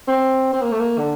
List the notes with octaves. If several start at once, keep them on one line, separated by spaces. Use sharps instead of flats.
C4
C4
A#3
A3
A#3
D3